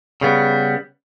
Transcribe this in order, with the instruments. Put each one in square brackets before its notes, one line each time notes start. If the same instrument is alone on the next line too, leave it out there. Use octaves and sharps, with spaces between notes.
[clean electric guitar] C#3 G3 B3